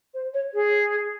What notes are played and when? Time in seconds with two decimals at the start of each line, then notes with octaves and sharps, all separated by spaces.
0.14 C5
0.34 C#5
0.54 G#4